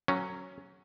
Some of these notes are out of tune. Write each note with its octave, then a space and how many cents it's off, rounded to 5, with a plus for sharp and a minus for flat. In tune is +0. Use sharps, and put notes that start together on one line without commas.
F#3 +0 A3 +45 C#4 +0